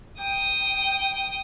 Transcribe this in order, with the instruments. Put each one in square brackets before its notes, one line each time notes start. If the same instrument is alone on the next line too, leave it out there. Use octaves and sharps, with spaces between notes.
[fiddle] G5 D#6